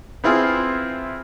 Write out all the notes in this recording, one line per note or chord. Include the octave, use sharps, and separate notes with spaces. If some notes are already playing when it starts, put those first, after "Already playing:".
B3 C4 E4 F4 G#4